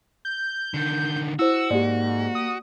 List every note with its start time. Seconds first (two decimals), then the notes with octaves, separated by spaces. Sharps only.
0.25 G6
0.74 D3 D#3
1.39 E4 F#4 C5 E6
1.70 G#2 A#3 G4 D5
2.35 D#6